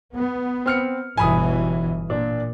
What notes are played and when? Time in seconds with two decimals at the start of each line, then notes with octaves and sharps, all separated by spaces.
0.13 B3
0.66 C4 F6 C#7
1.17 G1 B2 E3 G#5 B5 D#6
2.10 A#2 D4